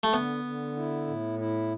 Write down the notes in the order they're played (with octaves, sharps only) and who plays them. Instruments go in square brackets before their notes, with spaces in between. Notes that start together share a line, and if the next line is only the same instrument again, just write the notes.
[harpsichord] A3
[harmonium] D3 [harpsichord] B3
[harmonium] D3
E4
A2
E4